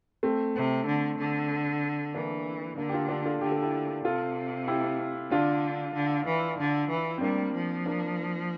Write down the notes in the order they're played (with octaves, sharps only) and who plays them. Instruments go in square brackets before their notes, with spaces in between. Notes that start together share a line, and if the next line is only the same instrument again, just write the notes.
[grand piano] A3 C4
[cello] C3
D3
D3
[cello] E3 [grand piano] A#3 D4
[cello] D3 [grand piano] A#3 D4
[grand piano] G4
D4 F4
D4 F4
F4 A4
[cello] D3 [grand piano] G4
[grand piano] A4
E4 G4
[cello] C3 [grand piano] F4 A4
[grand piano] E4 G4
[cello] D3 [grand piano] D4 F4
[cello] D3
E3
D3
E3
[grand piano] C4
[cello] G3 [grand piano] A#3 D4
[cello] F3
[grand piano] A#3 D4